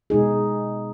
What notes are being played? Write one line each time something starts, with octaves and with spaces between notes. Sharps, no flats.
B2 G#3 D#4 G#4